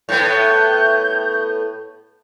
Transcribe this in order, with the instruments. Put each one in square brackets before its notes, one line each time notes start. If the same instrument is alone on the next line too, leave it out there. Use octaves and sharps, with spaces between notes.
[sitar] A2 B3 [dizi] G6